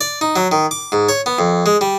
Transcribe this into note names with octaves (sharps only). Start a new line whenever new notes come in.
D5
D#4
F#3
D#3
D6
G#2
C#5
B3
F2
G#3
G3